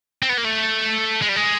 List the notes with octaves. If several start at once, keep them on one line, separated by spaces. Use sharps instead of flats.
C4
B3
A#3
A3
G#3
G3
G#3